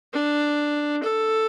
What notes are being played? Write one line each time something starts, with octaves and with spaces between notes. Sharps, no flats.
D4
A4